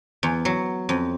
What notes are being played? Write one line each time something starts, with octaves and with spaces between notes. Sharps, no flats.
E2
F#3
F2